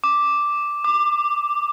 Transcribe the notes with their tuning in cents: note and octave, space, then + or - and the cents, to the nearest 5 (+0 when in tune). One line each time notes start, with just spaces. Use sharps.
D6 +0
D6 +20